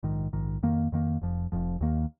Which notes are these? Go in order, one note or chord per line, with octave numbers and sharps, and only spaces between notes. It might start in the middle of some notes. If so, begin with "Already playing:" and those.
A#1 G#2 D#3
A#1 G#2 D#3
F2 D#3 A#3
F2 D#3 A#3
F1 F2 F3
F1 F2 F3
D#2 D#3 A#3